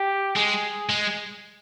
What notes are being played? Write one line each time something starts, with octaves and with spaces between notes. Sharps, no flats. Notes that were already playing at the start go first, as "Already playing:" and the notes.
Already playing: G4
G#3 G#4
G#3